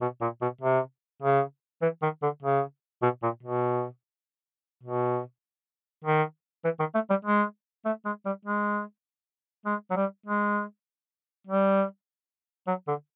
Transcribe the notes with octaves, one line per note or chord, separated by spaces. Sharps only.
B2
A#2
B2
C3
C#3
E3
D#3
D3
C#3
B2
A#2
B2
B2
D#3
E3
D#3
A3
G3
G#3
A3
G#3
G3
G#3
G#3
F#3
G3
G#3
G3
F#3
D3